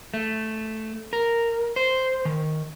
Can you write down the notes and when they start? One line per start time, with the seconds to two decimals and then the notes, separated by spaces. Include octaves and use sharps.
0.14 A3
1.13 A#4
1.76 C5
2.25 D#3